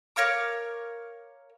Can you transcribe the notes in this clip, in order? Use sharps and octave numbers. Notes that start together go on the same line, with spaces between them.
A#4 C#5 F5 D6